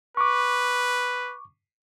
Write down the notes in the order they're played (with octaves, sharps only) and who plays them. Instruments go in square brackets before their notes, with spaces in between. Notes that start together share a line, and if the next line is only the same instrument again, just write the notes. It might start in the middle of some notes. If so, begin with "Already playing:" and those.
[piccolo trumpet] B4 [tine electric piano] C#6 D6